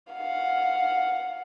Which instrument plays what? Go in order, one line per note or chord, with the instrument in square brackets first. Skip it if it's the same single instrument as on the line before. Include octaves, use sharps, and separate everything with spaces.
[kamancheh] F5 F#5